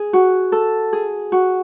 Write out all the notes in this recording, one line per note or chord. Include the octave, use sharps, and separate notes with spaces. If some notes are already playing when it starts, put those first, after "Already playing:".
Already playing: G#4
F#4
A4
G#4
F#4